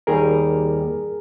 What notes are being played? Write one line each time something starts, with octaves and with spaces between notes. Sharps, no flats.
D#2 D#3 G3 G#4 A#4